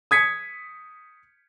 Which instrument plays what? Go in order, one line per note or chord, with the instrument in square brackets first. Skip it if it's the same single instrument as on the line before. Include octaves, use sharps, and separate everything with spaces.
[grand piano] D#6 G#6 B6 C#7